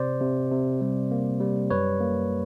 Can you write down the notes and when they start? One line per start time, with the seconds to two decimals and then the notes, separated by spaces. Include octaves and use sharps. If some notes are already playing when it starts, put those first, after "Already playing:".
Already playing: C3 C5 D5
0.21 C3
0.51 C3
0.81 G3
1.11 A#3
1.41 G3
1.70 F#2 B4 C#5
2.00 A#3